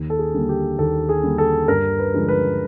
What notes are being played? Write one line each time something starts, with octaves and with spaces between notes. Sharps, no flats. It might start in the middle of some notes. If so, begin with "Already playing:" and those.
Already playing: D#2
A4
G#4
D3 G3 A#3
G4
D#2 A4
G#4
D3 G3 A#3
A4
G2 A#4
B4
D3 F3 G#3
B4